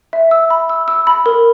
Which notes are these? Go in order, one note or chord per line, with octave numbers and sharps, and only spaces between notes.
E5
E6
B5
E6
E6
B5
A#4